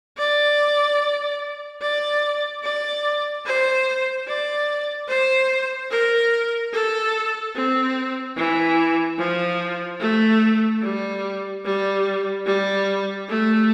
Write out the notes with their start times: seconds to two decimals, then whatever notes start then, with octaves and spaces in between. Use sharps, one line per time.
0.18 D5
1.81 D5
2.63 D5
3.46 C5
4.27 D5
5.09 C5
5.91 A#4
6.73 A4
7.55 C4
8.37 E3
9.19 F3
10.00 A3
10.82 G3
11.65 G3
12.46 G3
13.28 A3